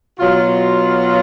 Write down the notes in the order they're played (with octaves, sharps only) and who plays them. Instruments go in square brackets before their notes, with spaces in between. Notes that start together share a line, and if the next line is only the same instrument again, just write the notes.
[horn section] B2 F#3 F4